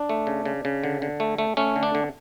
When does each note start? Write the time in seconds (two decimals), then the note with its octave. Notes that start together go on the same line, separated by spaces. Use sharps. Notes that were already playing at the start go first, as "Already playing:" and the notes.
Already playing: D4
0.09 A3
0.27 C#3
0.45 C#3
0.65 C#3
0.84 D3
1.02 D3
1.20 A3
1.38 A3
1.57 A3 C#4
1.76 D3
1.83 D4
1.95 D3